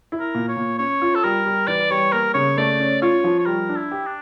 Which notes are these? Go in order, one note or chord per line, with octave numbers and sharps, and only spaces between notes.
E4
A#4
A#2
C#5
A#2
C#4 C#5
F4
A4
G3 A#4
G3
E3 D5
G3 C#5
A#3 A#4
C#3 C#5
A3 D5
C#4
F4 C#5
F3
C#5
G3 A#4
D4
E4
G4
D4